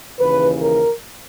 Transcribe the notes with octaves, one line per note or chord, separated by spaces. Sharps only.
D#2 C#3 E3 B4
A#4